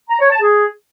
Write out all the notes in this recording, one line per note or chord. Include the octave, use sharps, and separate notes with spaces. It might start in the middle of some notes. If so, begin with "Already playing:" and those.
A#5
C#5
A5
G#4